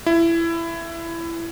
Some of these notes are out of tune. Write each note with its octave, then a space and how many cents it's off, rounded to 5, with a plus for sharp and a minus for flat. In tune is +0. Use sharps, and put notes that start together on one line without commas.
E4 +20